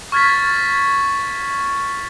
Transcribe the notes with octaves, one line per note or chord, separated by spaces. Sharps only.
C#6 F6 G#6 A6 B6